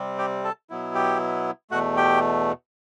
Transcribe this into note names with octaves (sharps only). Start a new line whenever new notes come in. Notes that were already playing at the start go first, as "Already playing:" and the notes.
Already playing: C3 G3 C4
G4 G5
A4 A5
B2 F#3 B3 E4
G4 G5
E2 B2 A3 F#4 F#5
G4 G5